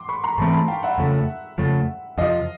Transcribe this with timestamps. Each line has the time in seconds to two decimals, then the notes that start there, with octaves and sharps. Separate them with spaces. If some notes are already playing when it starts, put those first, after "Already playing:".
Already playing: C6 D6
0.09 B5 C#6
0.23 A#5 C6
0.38 G#2 E3 A3 C4 A5 B5
0.53 A5 B5
0.68 F5 G5
0.83 E5 F#5
0.98 F2 C#3 F3 A3
1.58 F2 C#3 F3 A3
2.18 F2 C3 F3 D#5 F5